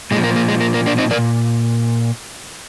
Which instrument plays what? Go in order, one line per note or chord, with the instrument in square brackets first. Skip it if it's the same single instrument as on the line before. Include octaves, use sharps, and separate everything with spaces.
[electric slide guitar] A#2 G#3
F3
A#3
A#3
G#3
A#3
A#3
A#3 D4
C4 D#4
F3 A#4 D5
A#2